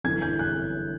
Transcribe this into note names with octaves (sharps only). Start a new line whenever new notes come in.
G1 G2 E3 G#6
G6
F#6